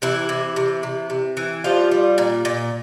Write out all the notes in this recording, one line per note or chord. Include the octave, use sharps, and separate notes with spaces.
C3 E3 E4
C3
C3
C3
C3
E3
F3 G3 F4
G3
A#2
A#2